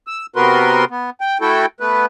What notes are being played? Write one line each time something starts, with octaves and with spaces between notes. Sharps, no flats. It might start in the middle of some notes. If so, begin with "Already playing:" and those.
E6
C3 B3 F#4 A#4 B4 C6
B3
G5
A3 E4 F#4 A4 G5
A3 B3 B4